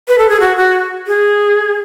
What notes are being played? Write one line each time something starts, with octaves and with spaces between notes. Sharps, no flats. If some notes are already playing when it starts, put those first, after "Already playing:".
B4
A4
G#4
F#4
F#4
G#4